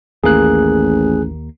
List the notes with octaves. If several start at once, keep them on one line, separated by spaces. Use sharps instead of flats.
A1 D#2 A#3 G#4 F#6